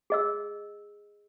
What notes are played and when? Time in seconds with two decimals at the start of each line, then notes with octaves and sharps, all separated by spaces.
0.10 G#4 D#5 E6